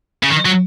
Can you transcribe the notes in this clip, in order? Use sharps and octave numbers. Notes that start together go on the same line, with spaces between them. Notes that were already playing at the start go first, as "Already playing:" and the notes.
C#3
D#3
F#3